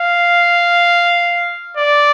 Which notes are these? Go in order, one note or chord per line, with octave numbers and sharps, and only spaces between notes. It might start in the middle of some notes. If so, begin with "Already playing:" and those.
Already playing: F5
D5